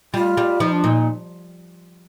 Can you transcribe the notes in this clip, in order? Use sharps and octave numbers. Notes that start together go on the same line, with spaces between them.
G3 F4
G3
F3 D#4
D4
A#2 D#4